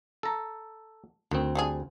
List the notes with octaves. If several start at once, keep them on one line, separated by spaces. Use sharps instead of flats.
A4 A#5
D2 D#3 C4
G3 D4 G#4